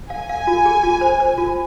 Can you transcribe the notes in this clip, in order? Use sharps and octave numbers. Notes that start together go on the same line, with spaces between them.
F5 G#5
F5
F4
G#4
F4
C5
C5
F4